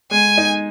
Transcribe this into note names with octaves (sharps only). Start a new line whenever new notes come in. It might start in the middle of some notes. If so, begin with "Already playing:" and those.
G#3 G#5
D#4